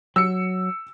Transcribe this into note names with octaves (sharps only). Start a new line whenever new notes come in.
F#3 E6 C#7